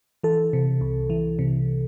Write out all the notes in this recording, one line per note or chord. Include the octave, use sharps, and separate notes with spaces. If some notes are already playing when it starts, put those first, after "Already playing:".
E3 A4
C3
C2
E3
C3